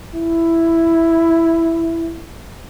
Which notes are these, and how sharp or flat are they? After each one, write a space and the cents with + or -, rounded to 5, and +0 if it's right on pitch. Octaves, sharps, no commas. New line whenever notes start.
E4 +5